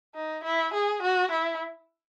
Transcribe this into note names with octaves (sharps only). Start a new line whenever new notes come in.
D#4
E4
G#4
F#4
E4